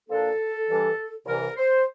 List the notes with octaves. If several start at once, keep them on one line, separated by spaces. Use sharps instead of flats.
A#2 F3 A#3 D4 A4
G2 E3 G3 D4
C2 C3 E3 A#4
C5